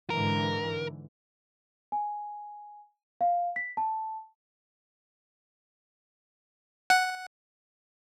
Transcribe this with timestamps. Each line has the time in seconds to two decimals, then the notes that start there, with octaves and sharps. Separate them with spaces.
0.10 G#2 D3 E3 A#4
1.92 G#5
3.21 F5
3.56 B6
3.77 A5
6.90 F#5